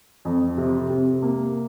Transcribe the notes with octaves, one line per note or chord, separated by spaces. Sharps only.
F2
C3
C3
A#3